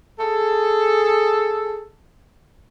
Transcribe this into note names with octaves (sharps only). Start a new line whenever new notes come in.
G#4 A4